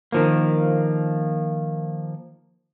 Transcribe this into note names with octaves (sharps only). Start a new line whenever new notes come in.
D#3 F3 A#3